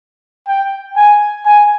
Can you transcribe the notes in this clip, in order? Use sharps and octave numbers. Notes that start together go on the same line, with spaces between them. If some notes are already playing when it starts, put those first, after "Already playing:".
G5
G#5
G#5